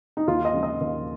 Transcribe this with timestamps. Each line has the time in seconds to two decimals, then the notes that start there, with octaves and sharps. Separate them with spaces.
0.17 D#4
0.27 D#2 F4
0.45 D#5
0.54 C#3 F3 G#3
0.63 D#5
0.81 D#2